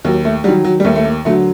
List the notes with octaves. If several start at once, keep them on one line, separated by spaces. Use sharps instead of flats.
D#2 F#3
A3
D#3 F#3 G3
F#3
G3
D#2 A3
A3
A#3
D3 F#3 A3